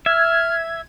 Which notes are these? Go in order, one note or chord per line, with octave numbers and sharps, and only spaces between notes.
E5 F6 G#6